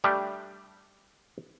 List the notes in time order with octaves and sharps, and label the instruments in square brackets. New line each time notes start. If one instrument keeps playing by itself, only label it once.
[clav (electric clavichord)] G3 A3 D4 G4